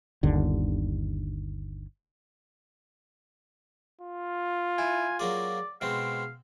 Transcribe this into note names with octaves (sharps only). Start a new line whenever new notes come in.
G1 D#2 D3
F4
E4 G#5
F#3 A#3 G#4 D5
B2 G#3 C4 F5